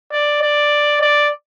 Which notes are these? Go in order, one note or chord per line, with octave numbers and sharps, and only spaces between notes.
D5
D5
D5